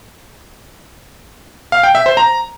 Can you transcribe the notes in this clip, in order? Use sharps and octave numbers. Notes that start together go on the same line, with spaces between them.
F5
G5
E5
C5
A#5